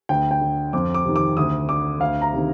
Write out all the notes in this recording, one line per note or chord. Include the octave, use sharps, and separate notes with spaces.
D2 G5
G5
D3
F2 D6
D6
C3 D#3
D6
D2 D#6
D3 D6
D2 F5
A#5
C3 D#3